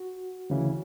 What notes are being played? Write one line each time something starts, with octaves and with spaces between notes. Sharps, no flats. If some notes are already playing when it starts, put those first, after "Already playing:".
Already playing: F#4
D2 C#3 E3